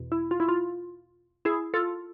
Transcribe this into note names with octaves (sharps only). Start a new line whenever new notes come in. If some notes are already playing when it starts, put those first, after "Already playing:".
Already playing: E2 B2
E4
F4
E4
F4
E4 G#4
F4 A4